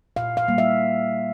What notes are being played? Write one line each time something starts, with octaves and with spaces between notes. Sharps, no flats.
A#2 F5
F5
G3 A#3
E5